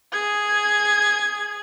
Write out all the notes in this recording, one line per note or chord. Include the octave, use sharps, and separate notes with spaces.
G#4 G#6